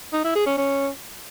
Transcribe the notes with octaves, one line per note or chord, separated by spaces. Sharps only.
D#4
E4
G#4
C#4
C#4